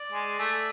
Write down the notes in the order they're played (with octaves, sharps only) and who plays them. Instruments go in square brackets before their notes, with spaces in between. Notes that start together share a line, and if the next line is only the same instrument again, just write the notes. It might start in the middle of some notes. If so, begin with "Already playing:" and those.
Already playing: [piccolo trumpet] D5
[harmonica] G#3
A3